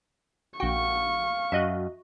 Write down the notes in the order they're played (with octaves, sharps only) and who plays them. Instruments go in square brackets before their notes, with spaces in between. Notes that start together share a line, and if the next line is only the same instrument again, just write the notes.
[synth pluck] A#1 G5 [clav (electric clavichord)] F#4 [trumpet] F5 [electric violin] C#6
[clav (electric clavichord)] F#2 [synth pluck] F#4 D#5 E5